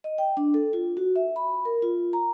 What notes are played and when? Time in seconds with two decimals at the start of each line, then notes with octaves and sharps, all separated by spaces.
0.04 D#5
0.18 G5
0.37 D4
0.54 A4
0.73 F4
0.97 F#4
1.16 E5
1.36 B5
1.65 A#4
1.82 F4
2.13 A#5